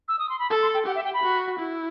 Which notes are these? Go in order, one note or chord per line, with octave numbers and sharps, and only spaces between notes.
E6
D#6
C6
B5
A4 A5
C6
G5
G4 F#5
E5
G5
B5
F#4
E4